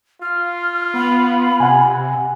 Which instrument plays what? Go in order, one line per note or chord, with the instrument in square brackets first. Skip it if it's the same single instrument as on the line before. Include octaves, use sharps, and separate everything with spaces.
[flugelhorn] F4 [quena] F6
[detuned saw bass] B3 [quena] B5
[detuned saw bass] C3 [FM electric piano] F#5 G#5